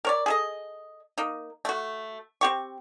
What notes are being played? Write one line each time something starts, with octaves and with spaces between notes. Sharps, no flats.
A#4 C#5 D5
G#4 A4 D#5
A#3 D#4
A3 F#4
C4 G4 C#6